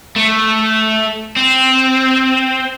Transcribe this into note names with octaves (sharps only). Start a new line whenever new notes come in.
A3
C4